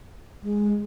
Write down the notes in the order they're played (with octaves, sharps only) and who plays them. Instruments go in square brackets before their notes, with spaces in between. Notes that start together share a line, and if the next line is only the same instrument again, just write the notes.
[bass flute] G#3